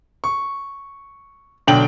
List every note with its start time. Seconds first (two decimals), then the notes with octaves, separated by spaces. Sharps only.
0.24 C#6
1.67 B1 D3 D4 G5 F#7